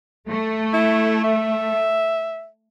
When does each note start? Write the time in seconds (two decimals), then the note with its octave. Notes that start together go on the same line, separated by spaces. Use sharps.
0.29 A3
0.74 E4
1.24 E5